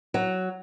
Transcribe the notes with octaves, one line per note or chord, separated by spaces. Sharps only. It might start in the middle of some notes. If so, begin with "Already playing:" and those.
F#3